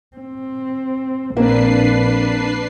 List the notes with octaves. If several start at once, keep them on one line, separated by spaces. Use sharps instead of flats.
C4
A#1 A#3 C4 D4 B4 C7